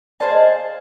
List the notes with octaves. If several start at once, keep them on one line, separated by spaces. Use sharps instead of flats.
G#4 C5 D5 F5 A5
D#5